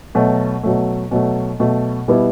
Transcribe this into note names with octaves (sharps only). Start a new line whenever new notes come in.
B2 F#3 A3
B2 F#3 A3
B2 F#3 A3
B2 F#3 A3
B2 G3 B3 E4